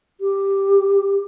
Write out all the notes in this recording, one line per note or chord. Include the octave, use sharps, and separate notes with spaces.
G4